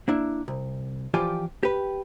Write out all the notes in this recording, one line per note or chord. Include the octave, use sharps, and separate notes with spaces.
A#3 D4 E4
C2
E3 F3 F4 G4 D5 G#5
G4 B4